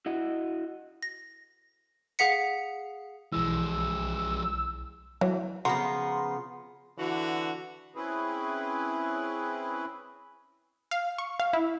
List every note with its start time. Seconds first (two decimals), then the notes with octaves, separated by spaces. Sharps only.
0.06 E4 F#4 D#5
1.03 A#6
2.19 G#4 F5 F#5 B6 C#7
3.33 B1 E3 F3 G#3 E6
5.21 E3 F#3
5.65 C#3 F3 B3 F#4 A#5 C6
6.97 D3 E3 F#4
7.96 C4 C#4 E4 G#4 B4
10.91 F5
11.18 C#6
11.40 F5
11.53 E4